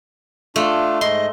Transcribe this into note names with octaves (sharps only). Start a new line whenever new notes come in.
A3 D4 F4
G#2 D#5 C6